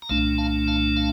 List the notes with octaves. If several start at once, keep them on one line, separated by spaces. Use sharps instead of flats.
A#5
C2 A#2 A3 D4 F5 A5
F5 A5
F5 A5
F5 A5